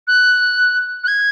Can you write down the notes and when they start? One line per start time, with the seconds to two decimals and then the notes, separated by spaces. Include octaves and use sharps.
0.07 F#6
1.04 F#6
1.07 G#6